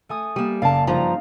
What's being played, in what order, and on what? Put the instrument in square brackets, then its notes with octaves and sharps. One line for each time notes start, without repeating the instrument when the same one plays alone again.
[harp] A3 G#5 D#6
[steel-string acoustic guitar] G3 A#3 [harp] D#7 E7
[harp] F#1 A#3 D5 [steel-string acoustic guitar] F5 A5
[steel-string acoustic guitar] G2 F3 A#5 [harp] D#4 F5